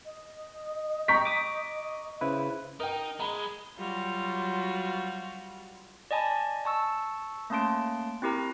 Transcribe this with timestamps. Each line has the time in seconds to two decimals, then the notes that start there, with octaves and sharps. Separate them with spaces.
0.05 D#5
1.08 G5 A#5 C#6 B6
1.25 D6 D#6
2.21 C#3 E4 B4 C5
2.80 D#4 A#4 G5
3.20 G#3 A#5 B5
3.77 F#3 G3 F4 F#4
6.11 D5 D#5 G#5 A5 B5
6.65 A5 C#6 E6
7.50 A3 A#3 C#4 A5 C6 D7
8.22 C4 E4 G4 A#4 A#5